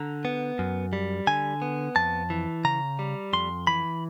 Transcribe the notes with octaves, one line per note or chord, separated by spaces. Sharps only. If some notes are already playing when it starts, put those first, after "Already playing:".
Already playing: D3 A#5
B3
F#2
G3
D3 G#5
B3
F2 A5
E3
C#3 A#5
G3
F2 C6
E3 B5